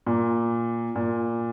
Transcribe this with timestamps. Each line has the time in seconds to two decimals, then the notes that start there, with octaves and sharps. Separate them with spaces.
0.06 A#2
0.96 A#2